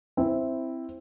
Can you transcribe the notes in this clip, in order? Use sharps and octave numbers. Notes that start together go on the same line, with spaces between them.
C4 E4